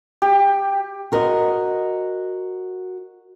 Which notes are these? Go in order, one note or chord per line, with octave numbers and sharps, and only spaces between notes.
G4
F#4 A#4 C5 D#5